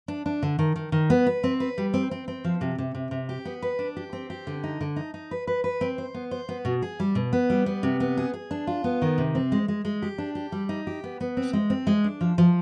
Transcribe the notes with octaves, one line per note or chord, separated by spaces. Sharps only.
D4
D4
D3
D#3
D#3
D#3
B3
B4
C4
B4
G3
C4
C4
C4
F3
C3
C3
C3
C3
G4
B3
B4
D4
G4
C4
G4
D3
D#4
D3
D#4
D#4
B4
B4
B4
C4
C5
B3
C5
B3
B2
G#4
G3
B2
B3
G3
B3
C3
B3
G#4
G#4
D4
F4
B3
D#3
C3
C4
G#3
G#3
G#3
G4
D4
G4
G3
D#4
G4
B3
B3
C4
G#3
C4
G#3
D4
F3
F3